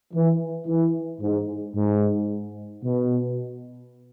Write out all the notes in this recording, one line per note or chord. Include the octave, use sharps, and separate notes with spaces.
E3
E3
G#2
G#2
B2